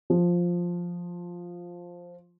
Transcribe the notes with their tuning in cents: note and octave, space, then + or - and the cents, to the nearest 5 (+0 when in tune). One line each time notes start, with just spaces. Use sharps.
F3 +5